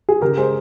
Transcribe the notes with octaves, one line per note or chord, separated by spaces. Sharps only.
G#4
C#3 G4 A#4
G#3 G#4 C5